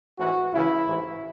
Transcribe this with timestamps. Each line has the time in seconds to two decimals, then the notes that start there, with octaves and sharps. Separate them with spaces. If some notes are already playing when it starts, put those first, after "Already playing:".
0.19 A1 G#2 E3 F#4
0.52 C#2 C#3 E3 E4
0.86 A1 G#2 E3